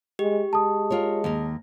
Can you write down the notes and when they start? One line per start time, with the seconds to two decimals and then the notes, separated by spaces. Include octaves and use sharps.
0.19 G#3 G4
0.53 G#3 A5 D#6
0.90 F4 A#4 C#5
1.24 D#2 A#4